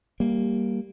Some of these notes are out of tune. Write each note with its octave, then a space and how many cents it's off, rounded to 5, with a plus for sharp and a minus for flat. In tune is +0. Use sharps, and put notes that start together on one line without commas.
G3 +0 A#3 +0